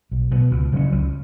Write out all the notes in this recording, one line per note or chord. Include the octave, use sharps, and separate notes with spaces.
B1
B2 B3
C#2
C#3 F#3 C#4
C#2